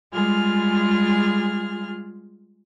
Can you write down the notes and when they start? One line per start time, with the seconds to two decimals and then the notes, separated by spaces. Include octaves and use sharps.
0.14 G3 G#3 F4 G#4 F6